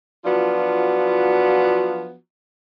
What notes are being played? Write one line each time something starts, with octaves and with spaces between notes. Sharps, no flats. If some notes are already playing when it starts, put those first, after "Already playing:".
F3 F#3 B3 D4 F4 F#4